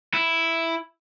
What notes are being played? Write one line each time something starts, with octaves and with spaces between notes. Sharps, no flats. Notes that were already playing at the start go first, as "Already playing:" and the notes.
E4